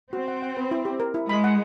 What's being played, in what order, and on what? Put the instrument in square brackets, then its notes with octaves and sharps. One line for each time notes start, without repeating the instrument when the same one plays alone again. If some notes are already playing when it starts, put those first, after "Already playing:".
[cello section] C4 [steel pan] F#4
[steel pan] F#5
F#5
B4
E4
G4
A#4
E4
[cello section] G#3 [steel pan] B5
[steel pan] F#5